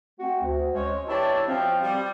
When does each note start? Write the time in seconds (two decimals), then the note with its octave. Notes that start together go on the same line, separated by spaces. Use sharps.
0.20 A3 C4 F#4
0.42 D2
0.74 G#3 C4 C#4 C#5
1.09 E3 D4 E4 G4 C#5 A5
1.48 B2 F3 C4
1.82 G3